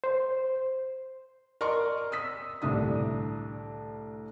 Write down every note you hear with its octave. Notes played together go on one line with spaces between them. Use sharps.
C5
A#4 D5 D#5 C6 C#6
D#6 E6 B6
C2 A2 D3 D4 D#6